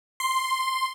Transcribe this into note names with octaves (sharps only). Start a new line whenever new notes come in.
C6